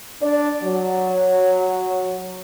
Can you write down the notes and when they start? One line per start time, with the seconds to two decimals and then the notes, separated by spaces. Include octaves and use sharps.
0.21 D4 D5
0.63 F#3